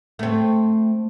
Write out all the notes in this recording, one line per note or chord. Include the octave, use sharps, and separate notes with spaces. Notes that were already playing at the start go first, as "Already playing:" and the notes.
A3 C4